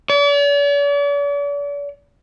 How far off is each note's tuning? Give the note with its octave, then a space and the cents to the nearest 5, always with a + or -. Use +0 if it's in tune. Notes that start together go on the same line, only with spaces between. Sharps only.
D5 -45